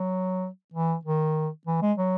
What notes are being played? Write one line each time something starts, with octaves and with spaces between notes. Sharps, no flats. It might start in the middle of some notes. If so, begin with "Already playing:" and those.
Already playing: F#3
E3
D#3
E3
G#3
F#3